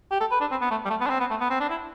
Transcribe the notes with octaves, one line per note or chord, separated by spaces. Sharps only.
G4
A4
B4
D4
C4
B3
A3
G3
A3
B3
D4
C4
B3
A3
B3
C4
D4
E4